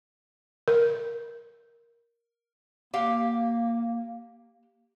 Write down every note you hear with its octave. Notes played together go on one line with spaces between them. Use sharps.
A#4
A#3 G4 F5 F#5